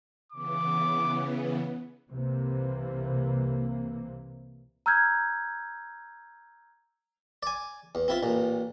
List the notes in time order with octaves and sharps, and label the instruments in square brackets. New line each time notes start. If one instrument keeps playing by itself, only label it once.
[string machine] C#3 E3 B3 [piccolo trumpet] D6
[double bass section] C2 C3 E3 A#3
[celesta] A#5 E6 F6 G6 G#6
[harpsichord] D5 G#5
E2
C4 E4 F4
A1 A#2